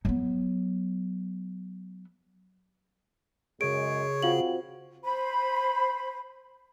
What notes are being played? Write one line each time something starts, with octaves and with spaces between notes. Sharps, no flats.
F#3 B3
F#2 C#3 G#3 G#4 C#5 D7
C4 F4 F#4 F5 F#7
C5 B5